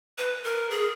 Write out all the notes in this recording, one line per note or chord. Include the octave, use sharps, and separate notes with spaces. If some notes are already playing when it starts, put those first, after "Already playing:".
B4
A#4
G#4